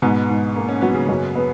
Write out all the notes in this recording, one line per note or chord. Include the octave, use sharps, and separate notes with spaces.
G#2 B2 B3
G#2
A#3
C#4
F#3 B3
C#3 C#4
F#2
B3